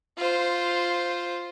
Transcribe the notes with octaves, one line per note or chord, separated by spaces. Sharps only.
F4 C5